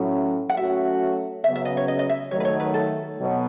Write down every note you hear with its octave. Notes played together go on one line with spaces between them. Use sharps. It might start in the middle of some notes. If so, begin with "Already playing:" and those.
Already playing: A2 F#3 C#4 E5
F#5
F#3 A3 C#4 F#4 E5
C#3 F#3 B3 E5
E5
D#5
C#5
D#5
D#5
E5
D#3 F#3 A3 C#5
B4
C#5
B4
A4
B2 F#3